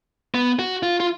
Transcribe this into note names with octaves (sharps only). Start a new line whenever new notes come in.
B3
F#4
F4
F4